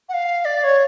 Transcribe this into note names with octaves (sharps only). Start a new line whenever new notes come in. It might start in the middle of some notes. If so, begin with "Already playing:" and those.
F#5
F5
D5
C#5